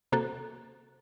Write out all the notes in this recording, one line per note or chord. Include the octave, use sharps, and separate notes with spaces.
C3 A#3 F#4 A4